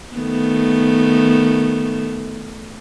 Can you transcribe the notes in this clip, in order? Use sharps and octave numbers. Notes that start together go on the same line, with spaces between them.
D#3 A3 B3